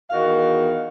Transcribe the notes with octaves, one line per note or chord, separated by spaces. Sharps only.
E2 D#3 F#4 F5